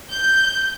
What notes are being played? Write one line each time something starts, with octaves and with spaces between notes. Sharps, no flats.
G6